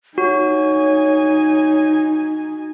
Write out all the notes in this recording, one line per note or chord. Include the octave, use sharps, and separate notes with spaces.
D#4 F#4 C#5 G#5